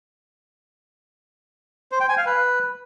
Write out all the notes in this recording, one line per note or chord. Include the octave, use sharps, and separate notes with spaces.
C5
G5
G#5
F5
B4